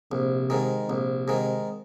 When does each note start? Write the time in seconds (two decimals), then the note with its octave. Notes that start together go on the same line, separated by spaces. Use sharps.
0.11 A#1 C3
0.50 G#2 D#3
0.89 A#1 C3
1.28 G#2 D#3